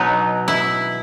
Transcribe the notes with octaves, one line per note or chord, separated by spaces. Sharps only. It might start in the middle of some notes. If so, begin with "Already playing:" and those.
Already playing: B2 F#3 B3 D#4
E4